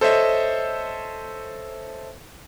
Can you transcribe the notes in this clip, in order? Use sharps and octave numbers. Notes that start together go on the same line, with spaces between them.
A4 C5 C#5 D#5 E5